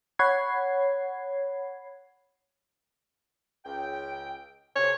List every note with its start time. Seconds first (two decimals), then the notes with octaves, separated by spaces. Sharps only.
0.19 C#5 F#5 B5 G#6 C7
3.65 C#2 G5
4.76 D2 C3 C5 C#5